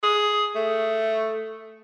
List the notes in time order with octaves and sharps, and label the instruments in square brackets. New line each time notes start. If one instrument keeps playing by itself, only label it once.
[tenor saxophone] G#4
A3